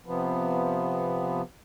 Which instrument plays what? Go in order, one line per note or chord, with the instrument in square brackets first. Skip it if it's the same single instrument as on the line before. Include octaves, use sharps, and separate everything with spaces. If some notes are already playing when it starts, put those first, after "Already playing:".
[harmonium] C3 F3 B3